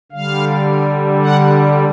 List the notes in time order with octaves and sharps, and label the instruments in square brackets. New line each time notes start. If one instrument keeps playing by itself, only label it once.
[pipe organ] D3 G3 F5
F#5